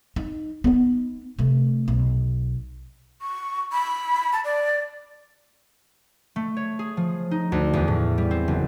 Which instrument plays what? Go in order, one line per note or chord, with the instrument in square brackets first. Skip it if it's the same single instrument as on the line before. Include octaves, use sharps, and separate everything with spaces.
[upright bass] D#4
B3 D#4
C3 A3
B1
[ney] C#6
B5
A5
D5
[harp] A3
C#5
G#4
F3
D#4
D2
E2
A2
G3
C4
F#1